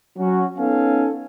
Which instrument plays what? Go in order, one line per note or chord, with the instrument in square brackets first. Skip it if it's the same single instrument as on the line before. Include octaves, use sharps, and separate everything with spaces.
[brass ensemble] F#3 C#4 F#4
B3 C#4 D#4 A4 F5 G#5